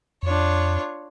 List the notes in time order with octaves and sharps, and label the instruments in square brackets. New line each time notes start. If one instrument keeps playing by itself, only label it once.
[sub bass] F2 [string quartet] D4 F4 C#5